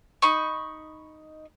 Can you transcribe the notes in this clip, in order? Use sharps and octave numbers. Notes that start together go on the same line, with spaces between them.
D#4 B5 C#6